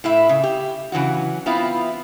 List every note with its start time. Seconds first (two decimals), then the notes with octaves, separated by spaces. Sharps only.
0.04 A2 E4 E5
0.29 C#3
0.43 G4
0.92 C#3 E3 F#3 F#4
1.46 B3 C4 E4 F4